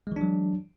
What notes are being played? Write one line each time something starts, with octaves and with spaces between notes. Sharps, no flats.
E3 F#3 G#3 D4